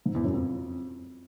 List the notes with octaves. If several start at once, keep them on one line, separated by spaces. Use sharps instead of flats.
G#2
E2
F#2
F2